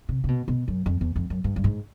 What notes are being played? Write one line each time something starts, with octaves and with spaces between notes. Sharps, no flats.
C3
C3
B2
B2
F#2
F2
E2
F2
F#2
G2
G2
G#2